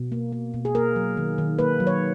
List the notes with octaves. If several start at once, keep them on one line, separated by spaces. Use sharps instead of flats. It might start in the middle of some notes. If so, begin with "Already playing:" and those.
Already playing: B2
A#3
A#3
B2
G#4
A#3 A#4
F#3
D#3
D#3
A#3 B4
F#3
C#5